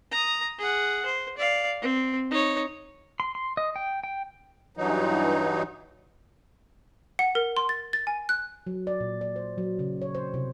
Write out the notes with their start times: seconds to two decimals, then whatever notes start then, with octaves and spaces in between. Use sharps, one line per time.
0.12 A#5 D#6
0.58 G#4 F#5
1.05 C5
1.37 D5 F5
1.81 C4
2.31 D#4 C#5
3.20 C6
3.35 C6
3.57 D#5
3.76 G5
4.04 G5
4.77 G2 E3 F#3 D#4
7.19 F#5
7.35 A#4
7.57 C6
7.69 A6
7.93 A6
8.07 G#5
8.29 F#6
8.67 F#3
8.87 D5
9.00 A#2
9.21 D5
9.36 C5
9.58 F#3
9.79 C#3
10.02 C#5
10.15 C5
10.34 C3